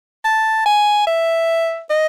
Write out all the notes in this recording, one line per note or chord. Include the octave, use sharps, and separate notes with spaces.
A5
G#5
E5
D#5